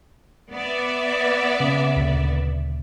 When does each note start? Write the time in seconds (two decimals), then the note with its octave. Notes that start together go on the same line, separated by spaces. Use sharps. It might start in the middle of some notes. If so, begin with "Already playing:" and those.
0.53 B3 D5 E5
1.60 C#3
1.96 D2 A#2